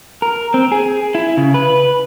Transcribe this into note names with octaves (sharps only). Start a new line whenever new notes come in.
A#4
C4
G#4
E4
C#3
B4